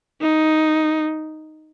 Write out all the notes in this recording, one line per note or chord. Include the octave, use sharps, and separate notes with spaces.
D#4